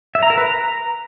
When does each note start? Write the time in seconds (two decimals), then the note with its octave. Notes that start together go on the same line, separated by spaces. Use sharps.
0.15 E5
0.23 A#5
0.30 A#4
0.38 B4
0.45 A#5